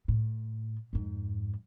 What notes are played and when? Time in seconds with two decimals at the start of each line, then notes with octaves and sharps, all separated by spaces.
0.08 A2
0.93 F2 G#2